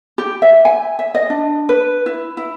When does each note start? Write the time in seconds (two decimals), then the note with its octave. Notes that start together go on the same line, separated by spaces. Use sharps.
0.18 G4
0.42 E5
0.65 G#5
0.99 E5
1.15 D#5
1.30 D4
1.69 B4
2.06 E4
2.37 E4